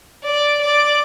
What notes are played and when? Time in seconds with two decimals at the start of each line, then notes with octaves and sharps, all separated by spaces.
0.24 D5
0.61 D5